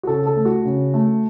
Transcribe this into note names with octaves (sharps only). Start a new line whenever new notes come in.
F#4
C#3 A4
A4
A3
F#4
C#3
A3